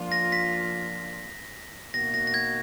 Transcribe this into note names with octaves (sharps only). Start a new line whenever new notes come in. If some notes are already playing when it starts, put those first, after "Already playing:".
Already playing: F3 A#3 D4 F4
A#6
B6
B2 A#3 D#4 F#4 A#6
A#6
A#6
G#6